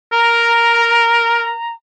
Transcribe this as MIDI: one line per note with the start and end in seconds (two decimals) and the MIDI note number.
0.12 1.52 70
0.12 1.72 82